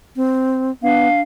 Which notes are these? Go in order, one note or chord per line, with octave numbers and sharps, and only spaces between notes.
C4
B3 D4 F5